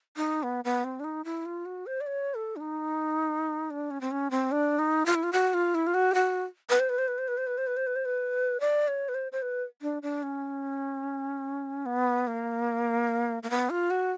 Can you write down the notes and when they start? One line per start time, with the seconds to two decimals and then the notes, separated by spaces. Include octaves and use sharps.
0.17 D#4
0.43 B3
0.65 B3
0.84 C4
1.00 D4
1.04 D#4
1.25 E4
1.46 F4
1.66 F#4
1.86 C5
2.01 D5
2.07 C#5
2.35 A4
2.56 D4
2.61 D#4
3.70 D4
3.91 C#4
4.01 C4
4.11 C#4
4.31 C4
4.52 D4
4.79 D#4
5.06 F4
5.15 E4
5.23 F4
5.33 F#4
5.54 F4
5.75 E4
5.87 F4
5.94 F#4
6.12 G4
6.14 F#4
6.70 B4
6.80 C5
6.89 B4
6.98 C5
7.08 B4
7.18 C5
7.28 B4
7.38 C5
7.47 B4
7.58 C5
7.67 B4
7.77 C5
7.87 B4
7.96 C5
8.05 B4
8.60 D5
8.88 C#5
9.09 B4
9.14 C5
9.32 C5
9.42 B4
9.82 D4
10.02 D4
10.23 C#4
11.86 B3
12.27 A#3
13.43 A#3
13.50 B3
13.70 F4
13.90 F#4